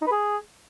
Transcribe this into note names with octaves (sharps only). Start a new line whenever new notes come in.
D#4
B4
G#4